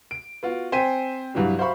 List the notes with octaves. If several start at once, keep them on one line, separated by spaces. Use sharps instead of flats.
D7
B3 F4 F#4
C4 C5 G5 G#5 B6 D#7
C2 G2 E3 F#3 G3
F#4 C5 E5 F5 B5 C#6